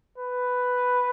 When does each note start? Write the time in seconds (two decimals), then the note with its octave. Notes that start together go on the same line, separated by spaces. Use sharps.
0.18 B4